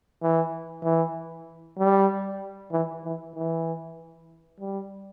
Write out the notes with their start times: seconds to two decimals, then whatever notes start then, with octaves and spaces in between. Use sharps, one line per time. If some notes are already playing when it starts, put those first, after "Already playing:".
0.22 E3
0.84 E3
1.78 G3
2.72 E3
3.04 E3
3.35 E3
4.60 G3